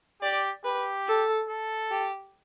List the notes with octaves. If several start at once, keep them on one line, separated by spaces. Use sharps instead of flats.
G4 D5
G4 B4
A4
A4
G4